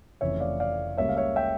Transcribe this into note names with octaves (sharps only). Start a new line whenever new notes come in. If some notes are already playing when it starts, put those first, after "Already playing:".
F1 F2 C#3 E3 A3 C#5 E5
D5 F5
D5 F5
C#2 C#3 G3 A#3 C#5 E5
F5
C#5 E5
E5 G5